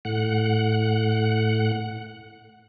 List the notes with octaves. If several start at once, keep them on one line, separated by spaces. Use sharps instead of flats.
A2 F#5